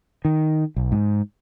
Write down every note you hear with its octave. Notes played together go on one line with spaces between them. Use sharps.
D#3
B1
G#2